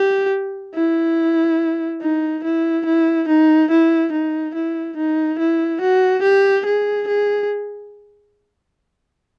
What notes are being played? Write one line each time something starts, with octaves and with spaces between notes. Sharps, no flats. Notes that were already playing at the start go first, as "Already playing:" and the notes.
Already playing: G4
E4
D#4
E4
E4
D#4
E4
D#4
E4
D#4
E4
F#4
G4
G#4
G#4